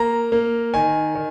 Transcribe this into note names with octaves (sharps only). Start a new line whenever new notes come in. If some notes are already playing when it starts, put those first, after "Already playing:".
Already playing: A#3 A#5
A#3
D#3 G#5
D#3